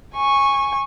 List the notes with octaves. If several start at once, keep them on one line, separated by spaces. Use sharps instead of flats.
G#5 C#6